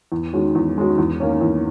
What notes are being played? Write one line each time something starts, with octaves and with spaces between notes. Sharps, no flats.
E2
D#3 G#3 C#4 F#4
E2
D#3 G#3 C#4 F#4
E2
D#3 A#3 C#4
E2